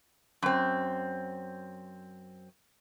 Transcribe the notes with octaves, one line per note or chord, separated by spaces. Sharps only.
F#2 C4